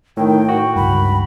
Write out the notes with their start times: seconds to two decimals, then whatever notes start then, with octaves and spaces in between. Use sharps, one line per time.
0.17 A2 D#3 G5
0.48 F#4
0.76 C#2 G2 B5